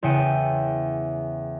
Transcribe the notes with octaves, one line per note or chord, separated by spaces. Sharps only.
E2 C#3 E5 G5 C#7 D#7